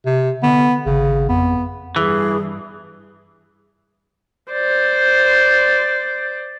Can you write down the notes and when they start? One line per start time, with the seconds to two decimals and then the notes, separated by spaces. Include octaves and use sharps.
0.06 C3
0.43 D3 B3
0.86 G#1 C#3
1.29 F2 B3
1.96 G2 E3 G#4
4.52 C5 D5